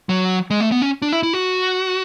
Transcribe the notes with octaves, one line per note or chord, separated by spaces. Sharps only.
F#3
G#3
A3
B3
C#4
D4
E4
E4
F#4